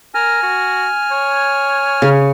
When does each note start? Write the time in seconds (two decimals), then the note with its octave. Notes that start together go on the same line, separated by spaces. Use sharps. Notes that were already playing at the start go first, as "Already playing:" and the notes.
0.15 A#4 G#5 F6
0.43 F#4
1.11 C#5
2.02 C#3